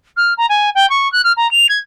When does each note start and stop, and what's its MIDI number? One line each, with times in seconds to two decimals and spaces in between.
0.17 0.34 89
0.37 0.46 82
0.49 0.70 80
0.75 0.89 79
0.90 1.11 85
1.12 1.22 90
1.24 1.33 89
1.37 1.50 82
1.51 1.67 101
1.69 1.79 92